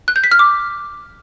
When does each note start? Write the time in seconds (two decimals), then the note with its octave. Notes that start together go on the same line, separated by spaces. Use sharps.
0.08 F#6
0.16 G6
0.24 B6
0.31 F6
0.39 D6